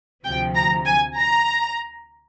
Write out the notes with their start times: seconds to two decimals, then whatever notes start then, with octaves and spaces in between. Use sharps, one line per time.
0.25 D2 C3 F3 G5
0.55 A#5
0.86 G#5
1.16 A#5